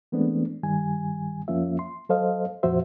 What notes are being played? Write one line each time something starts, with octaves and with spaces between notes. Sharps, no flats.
E3 G#3 A3 B3 C4 D4
G2 D#3 G3 G#5
F2 F3 A#3 C#4 F4 E5
C6
F#3 A4 C5 D#5 F5
F2 A#2 F3 F#4 C5 E5